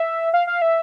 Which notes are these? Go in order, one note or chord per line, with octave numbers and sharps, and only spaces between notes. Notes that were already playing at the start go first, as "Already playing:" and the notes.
Already playing: E5
F5
F5
E5